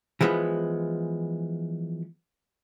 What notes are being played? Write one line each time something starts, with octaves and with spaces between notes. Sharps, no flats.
E3 F3 G#3 B3